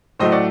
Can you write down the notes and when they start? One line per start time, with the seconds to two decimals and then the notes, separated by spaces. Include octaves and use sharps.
0.19 A2 F#3 A3 C5 D#5
0.32 D5 F#5